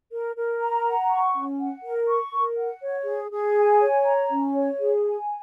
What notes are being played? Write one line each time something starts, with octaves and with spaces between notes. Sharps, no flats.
A#4
A#4
A#5
F#5
C#6
C#4
F#5
A#4
C#6
A#4
F#5
C#5
G#4
G#4
G#5
C#5
A#5
C#4
C#5
G#4
G#5